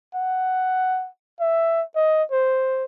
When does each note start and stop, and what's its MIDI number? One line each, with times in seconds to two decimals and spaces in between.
0.15 1.08 78
1.40 1.83 76
1.95 2.23 75
2.31 2.84 72